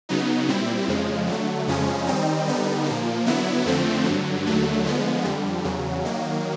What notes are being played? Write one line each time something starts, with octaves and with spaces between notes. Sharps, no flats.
C#3 F#3 B3 D#4
A#2 G3 C4 E4
F2 C#3 F3 G#3
D3 F#3 A3
F2 C#3 F3 G#3 C#4
D#3 G3 C4 D#4
D3 G3 B3 D#4
A#2 F3 A#3
D3 F#3 B3 E4
F2 D3 F3 A3 C4
G2 D3 F#3
D#2 D3 F#3 A3
D3 F3 G#3 B3
F2 D3 G3
E2 C#3 F#3
D#3 F#3 A#3